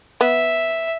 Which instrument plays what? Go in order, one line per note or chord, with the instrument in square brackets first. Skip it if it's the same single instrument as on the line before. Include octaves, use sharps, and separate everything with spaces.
[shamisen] B3 [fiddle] E5